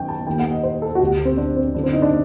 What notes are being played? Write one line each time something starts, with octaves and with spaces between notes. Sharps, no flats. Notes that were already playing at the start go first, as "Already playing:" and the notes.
Already playing: F#2 D#3 G5
A5
D#2 D#3 G5
F#5
D#5
C5
A4
F#4
D2 D3 G4
C4
D4
C4
F#2 D3 D4
C4
D#4
D4